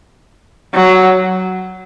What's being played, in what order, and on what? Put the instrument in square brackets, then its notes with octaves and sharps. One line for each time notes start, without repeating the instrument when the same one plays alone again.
[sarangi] F#3